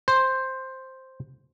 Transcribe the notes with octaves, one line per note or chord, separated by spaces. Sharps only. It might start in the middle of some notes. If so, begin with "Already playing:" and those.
C5